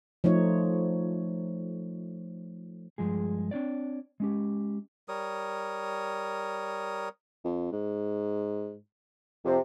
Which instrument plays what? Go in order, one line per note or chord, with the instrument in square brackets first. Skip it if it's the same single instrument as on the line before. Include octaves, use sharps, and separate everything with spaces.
[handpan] F3 A3 D#4 C#5
[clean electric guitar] G2 F3 G#3 G#4
C4 D4 C#5 D5
G#3 C#4 G4
[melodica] G3 A#4 C#5 D#6
[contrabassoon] F2
G#2
[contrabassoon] F2 [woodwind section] C3